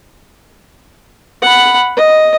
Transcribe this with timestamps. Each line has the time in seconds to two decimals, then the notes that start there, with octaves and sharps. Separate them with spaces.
1.42 F#5 B5
1.97 D#5